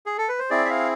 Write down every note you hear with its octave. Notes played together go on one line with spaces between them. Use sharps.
G#4
A4
B4
C5
C4 E4 G#4 D5
E5
F5